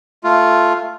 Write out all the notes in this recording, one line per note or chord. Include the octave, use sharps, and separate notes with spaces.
A3 F4